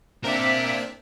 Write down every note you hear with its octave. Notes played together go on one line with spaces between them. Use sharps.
A#3 C4 D4 A#4 D5 E5